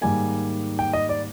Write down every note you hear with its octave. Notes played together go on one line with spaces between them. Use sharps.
G#2 D#3 G3 A#3 G#5
G5
D#5
D5